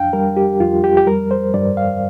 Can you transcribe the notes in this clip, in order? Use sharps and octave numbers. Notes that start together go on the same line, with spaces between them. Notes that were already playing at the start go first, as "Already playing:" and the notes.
Already playing: F2 D4 F5 G5
G3 A#4
G4
F2 F4
G4
G4
G3 A#4
C5
G2 D5
F5